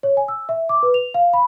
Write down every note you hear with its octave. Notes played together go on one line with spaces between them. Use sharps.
C#5
G#5
E6
E5
D6
B4
F7
F5
B5